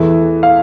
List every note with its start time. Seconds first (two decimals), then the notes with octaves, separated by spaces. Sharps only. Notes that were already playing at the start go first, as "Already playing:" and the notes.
Already playing: E2 E3 A3
0.43 F5